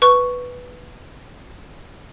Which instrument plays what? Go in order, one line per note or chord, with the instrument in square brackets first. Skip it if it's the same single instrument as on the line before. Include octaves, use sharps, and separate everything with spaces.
[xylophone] B4 C#6